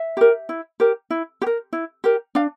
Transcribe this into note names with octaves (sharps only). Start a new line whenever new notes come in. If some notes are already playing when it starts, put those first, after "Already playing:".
Already playing: E5
G4 A#4
E4
G4 A#4
E4
G4
A#4
E4
G4 A#4
D4 F5